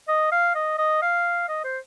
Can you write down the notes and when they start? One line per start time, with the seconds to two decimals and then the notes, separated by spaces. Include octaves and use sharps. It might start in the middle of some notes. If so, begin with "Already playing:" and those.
0.08 D#5
0.32 F5
0.55 D#5
0.78 D#5
1.03 F5
1.49 D#5
1.64 C5